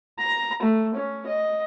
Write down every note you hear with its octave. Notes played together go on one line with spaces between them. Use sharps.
A#5
A3
C#4
D#5